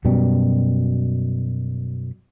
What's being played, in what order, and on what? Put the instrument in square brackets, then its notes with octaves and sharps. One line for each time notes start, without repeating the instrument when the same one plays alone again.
[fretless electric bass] F#2 B2 G3